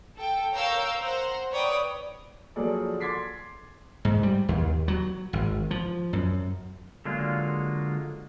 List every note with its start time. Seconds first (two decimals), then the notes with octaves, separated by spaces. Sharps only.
0.18 A4 G5
0.54 A#4 C#5 F5 E6 G6
0.99 C5 F#5 A#5
1.51 B4 C#5 D5 G5 D#6
2.56 F3 F#3 A#3 G#4 A4 D5
3.00 C6 D6 G#6 A6 B6 C7
4.05 G#2
4.23 G3
4.49 D#2
4.88 F#3
5.33 G#1
5.71 F3
6.13 F#2
7.05 D3 F#3 G#3 A#3 F4